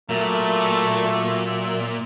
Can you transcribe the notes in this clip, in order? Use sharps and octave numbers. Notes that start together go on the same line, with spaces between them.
A#2 F#3 A3 A#3 E5